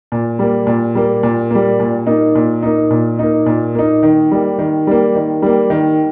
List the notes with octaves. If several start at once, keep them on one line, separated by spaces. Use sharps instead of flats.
A#2
G3 A#3
A#2
G3 A#3
A#2
G3 A#3
A#2
A#3 D#4
A#2
A#3 D#4
A#2
A#3 D#4
A#2
A#3 D#4
D#3
G3 A#3
D#3
G3 A#3
D#3
G3 A#3
D#3